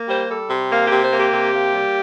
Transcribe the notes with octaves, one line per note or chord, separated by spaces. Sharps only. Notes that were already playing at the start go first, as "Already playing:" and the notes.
Already playing: A#3
G3 C5
G3 A4
C3
A#3 F5
G4
C3
C5
A#3
G4
C3
A#3
G3